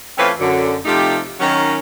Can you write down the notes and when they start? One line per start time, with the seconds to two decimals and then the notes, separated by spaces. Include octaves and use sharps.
0.18 E3 A3 C4 C#4 F4 B4
0.39 F#2 D3
0.85 C3 F3 A3 D#4 G4
1.40 D#3 F#3 C#4